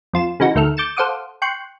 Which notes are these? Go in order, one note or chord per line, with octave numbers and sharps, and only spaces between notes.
F2 F4 E7
C#3 E3 D#4 F#4
D2 D#3 A3 A4 F6
D6 G6 A6 C#7 E7
A4 C5 F5 F#5 D6 D#6
G5 C6 C#6 F#6